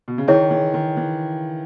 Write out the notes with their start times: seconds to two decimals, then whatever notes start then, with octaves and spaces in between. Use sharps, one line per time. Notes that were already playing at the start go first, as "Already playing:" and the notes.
0.08 B2
0.18 C#3
0.28 D#3 E4 G#4 C#5
0.51 E3
0.74 D#3
0.97 E3